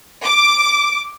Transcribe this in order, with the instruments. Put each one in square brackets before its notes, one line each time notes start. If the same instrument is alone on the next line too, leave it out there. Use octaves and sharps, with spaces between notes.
[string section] D6